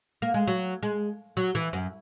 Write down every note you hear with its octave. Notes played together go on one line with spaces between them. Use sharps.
A#3
G#3
F#3
G#3
F#3
E3
F#2